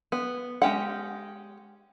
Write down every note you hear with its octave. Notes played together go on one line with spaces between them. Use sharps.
B3
G#3 C#4 G4 F#5